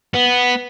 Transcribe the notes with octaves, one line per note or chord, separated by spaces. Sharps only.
B3